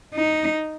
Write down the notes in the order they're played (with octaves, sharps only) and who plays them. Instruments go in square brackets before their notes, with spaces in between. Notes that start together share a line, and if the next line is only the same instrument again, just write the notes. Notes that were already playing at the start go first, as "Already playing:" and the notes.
[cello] D#4